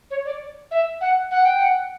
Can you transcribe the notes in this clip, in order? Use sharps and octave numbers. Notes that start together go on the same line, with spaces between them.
C#5
D5
E5
F#5
F#5
G5
F#5